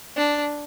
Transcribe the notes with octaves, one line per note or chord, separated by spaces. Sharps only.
D4